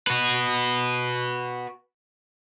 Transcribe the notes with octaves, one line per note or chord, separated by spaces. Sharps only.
F#4 B4